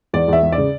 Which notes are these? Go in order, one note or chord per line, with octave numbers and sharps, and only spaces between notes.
E2 D5
E2 E5
E2
D5
C#3